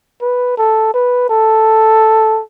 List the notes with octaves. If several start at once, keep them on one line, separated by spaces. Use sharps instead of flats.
B4
A4
B4
A4